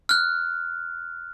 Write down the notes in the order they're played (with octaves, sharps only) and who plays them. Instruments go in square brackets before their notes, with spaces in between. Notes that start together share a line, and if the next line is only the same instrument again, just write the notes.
[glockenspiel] F6 F#6